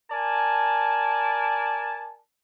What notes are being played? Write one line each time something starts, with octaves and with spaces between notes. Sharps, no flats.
A#4 D5 G#5 A5